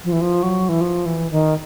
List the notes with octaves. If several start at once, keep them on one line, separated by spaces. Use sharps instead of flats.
F3
E3
F3
F#3
E3
F3
E3
D#3